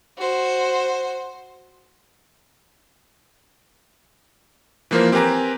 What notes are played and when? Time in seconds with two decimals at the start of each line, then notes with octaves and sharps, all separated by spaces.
0.18 F#4 C5
4.91 E3 F3 A#3 F4 A#4 C5
5.12 C4 G4 A#4 B4 G#5 A#5